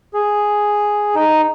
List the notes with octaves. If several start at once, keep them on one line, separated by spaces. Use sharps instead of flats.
G#4
D#4